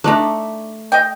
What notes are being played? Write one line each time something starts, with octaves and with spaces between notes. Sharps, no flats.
A3 D4 D#4 D5
D#5 G5